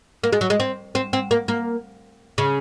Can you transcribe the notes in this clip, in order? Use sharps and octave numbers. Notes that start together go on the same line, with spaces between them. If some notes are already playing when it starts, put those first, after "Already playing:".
A#3
G#3
F#3
G#3
C4
C4
C4
A#3
A#3
C#3